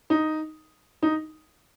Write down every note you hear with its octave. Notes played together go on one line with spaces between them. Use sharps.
D#4
D#4